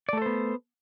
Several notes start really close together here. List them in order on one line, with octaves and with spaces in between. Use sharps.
D5 A3 A4 C5 B3